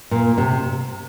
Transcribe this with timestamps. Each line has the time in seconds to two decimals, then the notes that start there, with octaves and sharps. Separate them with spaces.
0.11 A#2
0.38 C3